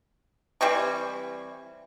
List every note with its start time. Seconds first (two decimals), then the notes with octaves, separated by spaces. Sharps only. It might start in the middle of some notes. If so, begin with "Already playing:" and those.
0.61 E3 G3 C4 C#6